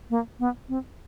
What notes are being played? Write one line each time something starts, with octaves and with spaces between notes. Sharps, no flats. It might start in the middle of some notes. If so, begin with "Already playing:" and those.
A#3
B3
C4